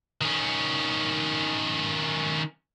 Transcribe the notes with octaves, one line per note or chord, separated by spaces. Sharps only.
D#3 C#4